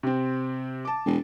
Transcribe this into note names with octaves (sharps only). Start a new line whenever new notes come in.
C3 C4
A5 D6
E1